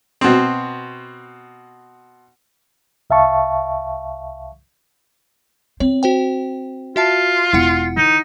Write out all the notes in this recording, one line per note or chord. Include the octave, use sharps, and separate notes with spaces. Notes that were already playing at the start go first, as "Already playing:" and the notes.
B2 C4
C2 E5 F5 A5 C#6
C4 C#5
F#4 C5 G5
F4 F#4 E5 A5
E1 E4 F#5 C#7
D#3 D#4